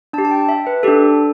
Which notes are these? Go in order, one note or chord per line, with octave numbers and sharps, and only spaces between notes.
D4 G4 A5
A5
G5
E5
B4
D4 G4 A4